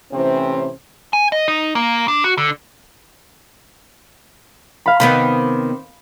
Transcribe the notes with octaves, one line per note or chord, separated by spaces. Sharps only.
A2 C3 E3 C4 C#4 C5
G#5
D#5
D#4
A#3
D4
F#4
D3
F5 B5
C3 D#3 B3 B5 D7